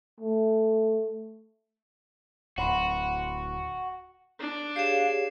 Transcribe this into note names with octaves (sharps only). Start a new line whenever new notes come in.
A3
D1 F#4 F#5 B5 C6
D4
G4 G#4 C#5 F5 C7 E7